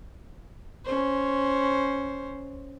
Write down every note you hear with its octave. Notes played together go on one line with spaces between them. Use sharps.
C#4 C5